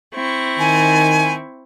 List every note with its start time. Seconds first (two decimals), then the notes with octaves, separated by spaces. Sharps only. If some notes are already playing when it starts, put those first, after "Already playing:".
0.13 C4 E4 C#6
0.59 D#3 G#5